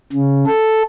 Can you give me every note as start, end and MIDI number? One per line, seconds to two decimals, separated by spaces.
0.13 0.44 49
0.46 0.82 69